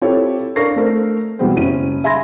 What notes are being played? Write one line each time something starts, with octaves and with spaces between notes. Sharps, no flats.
C4 E4 F4 G4 A4 C#5
D4 A#4 F5 C#6 A#6 C7
A3 A#4 C5
B2 E3 G3 G#3 B3 C4
F#1 C#4 D#7
E5 G#5 B5 C6 G#6 A#6